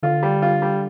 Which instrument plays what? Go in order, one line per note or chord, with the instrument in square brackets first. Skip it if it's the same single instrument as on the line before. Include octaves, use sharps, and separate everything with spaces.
[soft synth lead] D3 [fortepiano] F4
[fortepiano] G3
F4
G3